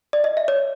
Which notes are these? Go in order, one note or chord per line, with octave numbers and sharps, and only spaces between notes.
D5
D#5
E5
C#5